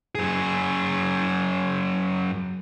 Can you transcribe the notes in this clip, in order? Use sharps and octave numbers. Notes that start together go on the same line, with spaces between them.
F#2 G#4